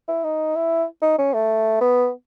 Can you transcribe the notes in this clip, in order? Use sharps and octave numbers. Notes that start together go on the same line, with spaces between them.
E4
D#4
E4
D#4
C#4
A3
B3